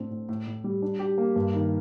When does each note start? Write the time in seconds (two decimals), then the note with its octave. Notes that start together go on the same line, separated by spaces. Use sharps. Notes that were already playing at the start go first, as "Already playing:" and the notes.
Already playing: A2 C4 D4
0.11 A2
0.29 A2
0.47 A2
0.64 G3
0.82 D4
0.99 G4
1.18 A#3
1.36 G2
1.54 D#3